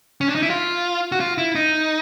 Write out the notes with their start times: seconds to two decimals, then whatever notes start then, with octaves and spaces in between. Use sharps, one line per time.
0.21 C#4
0.28 D4
0.35 D#4
0.43 E4
0.50 F4
1.12 F#4
1.20 F4
1.38 E4
1.55 D#4